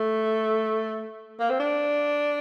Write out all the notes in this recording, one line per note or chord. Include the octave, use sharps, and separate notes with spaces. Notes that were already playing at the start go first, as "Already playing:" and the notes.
Already playing: A3
A#3
C4
D4